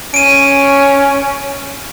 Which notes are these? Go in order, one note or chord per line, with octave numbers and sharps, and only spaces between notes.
C#4 D7 D#7